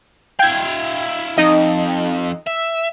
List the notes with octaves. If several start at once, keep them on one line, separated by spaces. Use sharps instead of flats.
E4 F5 G5 G#6
F2 D#4 D#5
E5